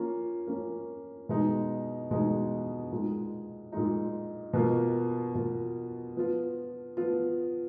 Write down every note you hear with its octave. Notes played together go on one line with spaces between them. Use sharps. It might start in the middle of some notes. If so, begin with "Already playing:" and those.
Already playing: F3 A#3 C#4 F4
F3 A#3 C#4 F4
B2 G#3 D#4
B2 G#3 D#4
A#2 G#3 D#4
A#2 G#3 D#4
B2 A#3 F4
B2 A#3 F4
F3 B3 F4
F3 B3 F4